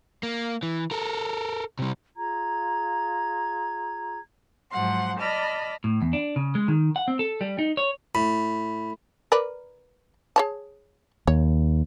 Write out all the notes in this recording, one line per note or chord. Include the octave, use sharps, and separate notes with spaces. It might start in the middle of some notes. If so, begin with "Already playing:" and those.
A#3
E3
A4 A#4
C3 G3
F4 G#4 A#5 G#6
G#2 F3 F#3 F#5 C6
D5 D#5 A5 B5 F6
A2
E2
D4
C#3
G#3
D#3
F#5
C4
A4
G3
D#4
C#5
A2 B5
A#4 B4 D5
G#4 C#5 A5
D#2 C#5